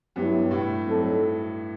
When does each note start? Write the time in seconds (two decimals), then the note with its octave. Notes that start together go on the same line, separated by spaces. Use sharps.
0.16 G2 F#3 B3 E4 G4
0.51 A2
0.86 F#3 C4 D#4 A4